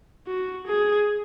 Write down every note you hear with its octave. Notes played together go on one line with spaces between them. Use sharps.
F#4
G#4